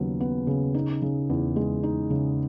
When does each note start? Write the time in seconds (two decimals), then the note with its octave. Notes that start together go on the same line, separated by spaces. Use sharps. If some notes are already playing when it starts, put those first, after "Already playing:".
Already playing: D#2 C#3 F#3 B3
0.20 B3
0.47 C#3
0.74 D#4
1.02 C#3
1.30 E2
1.56 G#3
1.83 D#4
2.10 C#3